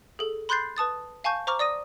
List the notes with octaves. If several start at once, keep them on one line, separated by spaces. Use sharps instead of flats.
G#4 A4
B5 C6 F#6 G6 A6 C7
B4 A5 D#6 A6
F5 G#5 A5 C#6 G6
C5 A#5 C#6 D6 F6
D5 D#6 A#6 D#7